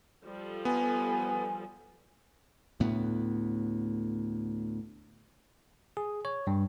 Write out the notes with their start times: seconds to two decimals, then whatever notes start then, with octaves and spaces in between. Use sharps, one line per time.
0.24 F3 G3 A4
0.65 B3 G#5
2.80 D2 A2 B3
5.97 G#4
6.25 C#5
6.47 G2